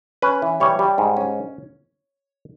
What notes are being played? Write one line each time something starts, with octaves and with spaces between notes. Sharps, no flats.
C#4 B4
E3
G3 C#5
G3
G#2
C#4